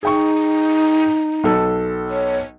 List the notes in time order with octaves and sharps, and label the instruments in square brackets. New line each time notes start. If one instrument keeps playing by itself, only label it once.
[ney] D#4 [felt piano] G#4 G5 C#6
[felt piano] B1 A4
[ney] C#5